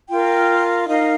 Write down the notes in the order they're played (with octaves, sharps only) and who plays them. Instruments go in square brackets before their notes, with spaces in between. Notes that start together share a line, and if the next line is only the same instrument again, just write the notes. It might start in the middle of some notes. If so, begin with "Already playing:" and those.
[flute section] F4 A#4 G5
D#4 A#4 F5